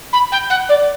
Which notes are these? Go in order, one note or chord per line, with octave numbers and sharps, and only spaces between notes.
B5
G5
F#5
D5